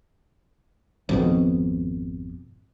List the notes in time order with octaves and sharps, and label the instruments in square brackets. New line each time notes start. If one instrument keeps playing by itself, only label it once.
[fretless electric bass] G#1 F2 B2